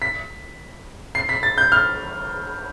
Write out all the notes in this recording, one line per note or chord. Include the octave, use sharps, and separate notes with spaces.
B6
C7
B6
A6
G6
F6